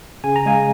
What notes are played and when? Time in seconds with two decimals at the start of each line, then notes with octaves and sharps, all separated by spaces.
0.24 C#3 G#5
0.36 A#5
0.46 G#3 F5 G#5